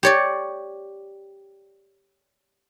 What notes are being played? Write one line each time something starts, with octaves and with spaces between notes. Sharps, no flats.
G4 C#5 D5